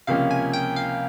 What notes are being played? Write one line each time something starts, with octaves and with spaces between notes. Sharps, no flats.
C#2 C3 F3 A#3 C#4 F5
G#5
G5
F5